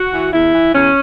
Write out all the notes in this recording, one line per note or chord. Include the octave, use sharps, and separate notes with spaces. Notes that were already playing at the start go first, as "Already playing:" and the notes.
Already playing: F#4
E3
E2 E4
E3
E2 C#4